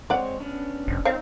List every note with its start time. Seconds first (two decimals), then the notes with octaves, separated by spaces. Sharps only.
0.10 G#3 C4 C#5 D5 F#5
0.40 B3 C#4 D4
0.87 F1
1.05 C4 D#4 C#5 F5